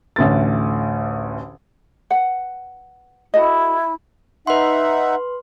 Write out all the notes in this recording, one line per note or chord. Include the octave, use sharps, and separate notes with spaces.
A1 D2 A6
B4 F#5
E4 F#4 A4 D#5
D#4 B4 E5 F#5 C6